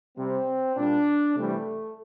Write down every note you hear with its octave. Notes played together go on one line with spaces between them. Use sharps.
C3 G3 C4
A#2 G3 D4
C3 E3 G3 A3